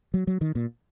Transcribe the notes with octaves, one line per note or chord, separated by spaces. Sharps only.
F#3
F#3
D#3
A#2